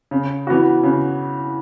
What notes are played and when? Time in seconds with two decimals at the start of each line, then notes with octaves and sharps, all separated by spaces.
0.11 C#3
0.47 E3 B3 F#4
0.83 C#3